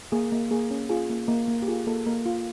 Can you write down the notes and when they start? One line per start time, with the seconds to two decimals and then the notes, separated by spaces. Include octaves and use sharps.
0.12 A#3 G#4
0.32 A#3
0.51 A#3 G#4
0.71 C#4
0.89 F4 G#4
1.09 A#3
1.28 A#3
1.48 A#3
1.62 G4
1.68 F4 G#4
1.87 A#3 A4
2.06 A#3 A#4
2.26 F4